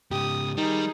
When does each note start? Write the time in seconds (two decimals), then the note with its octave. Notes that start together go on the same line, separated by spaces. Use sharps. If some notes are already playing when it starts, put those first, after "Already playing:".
0.11 G#2 C#3 G4 D#6
0.57 D#3 G3 D#4 G#4